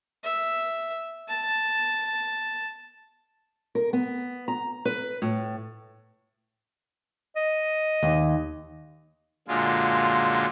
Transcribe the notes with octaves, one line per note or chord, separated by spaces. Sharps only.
E5
A5
A#4
B3
A#5
B4
A2
D#5
D#2
F#2 A#2 D3 G#3 F4